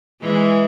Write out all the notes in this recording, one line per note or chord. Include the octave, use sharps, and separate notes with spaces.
E3 G#3